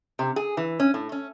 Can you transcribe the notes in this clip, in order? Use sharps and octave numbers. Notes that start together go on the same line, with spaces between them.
C3
G#4
E3
C#4
A2
C#4